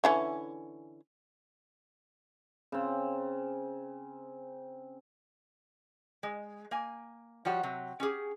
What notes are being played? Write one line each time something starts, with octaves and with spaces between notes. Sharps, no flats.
D3 E3 C#4
C#3 C4
G#3
A#3 G#5
F3 G3 F#4 C#5
C3 F#3
C#4 G4 G#4